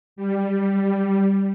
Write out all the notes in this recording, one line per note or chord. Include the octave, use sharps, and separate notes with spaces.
G3